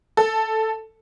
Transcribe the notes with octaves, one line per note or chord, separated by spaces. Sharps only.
A4